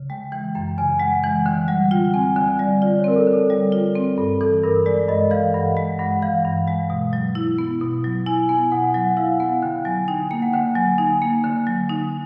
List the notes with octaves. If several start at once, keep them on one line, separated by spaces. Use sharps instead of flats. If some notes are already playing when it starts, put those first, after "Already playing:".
Already playing: C#3
G#3 G5
E3 G5
F#2 G5
C#3 G#5
G#3 F#5
E3 G#5
D3 G5
G3 F#5
F4 G5
C4 G#5
D3 G#5
G3 D5
F4 D5
C#5
C4 A#4
A4
D3
A4
G3
F4
C4
G2 A4
E3 A4
G2 A#4
G#3 D5
G2 D#5
E3 F5
G2 F#5
G#3
G2 F#5
E3 F5
G2
G#3
B2
F#3
E4
B3
B2
F#3
E4 G#5
B3 G#5
B2 F#5
F#3 F#5
E4 F5
B3 F#5
D3 G5
F#3 G#5
D#4 G5
A#3 G5
F#5
D3 G5
F#3 G#5
D#4 G#5
A#3
D3
F#3
D#4